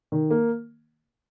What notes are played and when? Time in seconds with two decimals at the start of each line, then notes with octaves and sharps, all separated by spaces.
0.12 D#3
0.30 A#3